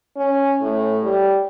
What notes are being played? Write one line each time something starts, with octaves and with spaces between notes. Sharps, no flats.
C#4
A2
G3